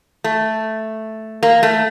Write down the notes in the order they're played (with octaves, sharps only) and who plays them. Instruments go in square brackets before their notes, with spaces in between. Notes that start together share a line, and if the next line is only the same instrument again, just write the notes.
[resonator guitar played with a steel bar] A3
A#3
A3